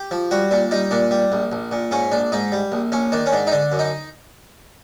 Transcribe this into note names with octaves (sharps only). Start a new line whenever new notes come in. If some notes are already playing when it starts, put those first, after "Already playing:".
Already playing: G4
F3
G3 F#4
A#2 D4
G3 D#4
A#2 D4
G3
A#1
A#1
A#2
G#2 C#4
A#1 D4
G#2 D#4
G3
A#1
A#1 C#4
D#3 D4
C#4
G#2 D4
D#4
D3 D4
F#2
D#4